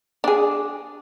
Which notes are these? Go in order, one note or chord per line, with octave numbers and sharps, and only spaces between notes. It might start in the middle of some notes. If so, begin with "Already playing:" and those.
D4 G#4